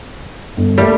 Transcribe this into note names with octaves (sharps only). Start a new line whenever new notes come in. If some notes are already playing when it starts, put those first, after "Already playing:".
G1
G3 A3 A#3